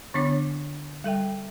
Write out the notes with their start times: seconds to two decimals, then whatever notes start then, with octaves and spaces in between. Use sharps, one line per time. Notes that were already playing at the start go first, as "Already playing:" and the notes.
0.14 D3 B3 D4 C#5 D6
1.04 G3 A4 E5 G5